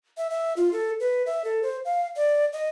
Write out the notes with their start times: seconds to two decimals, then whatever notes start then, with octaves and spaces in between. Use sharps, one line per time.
0.17 E5
0.30 E5
0.57 F4
0.73 A4
1.00 B4
1.26 E5
1.44 A4
1.63 C5
1.85 F5
2.16 D5
2.53 D#5